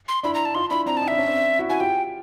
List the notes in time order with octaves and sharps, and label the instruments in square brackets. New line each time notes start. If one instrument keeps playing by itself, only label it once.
[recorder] C6
[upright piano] D4 E4 [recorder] B5
[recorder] A#5
A5
[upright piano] D#4 F4 [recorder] C6
[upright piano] D4 E4 [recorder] B5
[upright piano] C4 D4 [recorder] A#5
[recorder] A5
[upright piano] D#4
[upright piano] D4 [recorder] E5
[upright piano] C#4
C4 D4
E4 F#4
[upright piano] E4 F#4 [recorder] G#5
[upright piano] F4 G4 [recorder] G5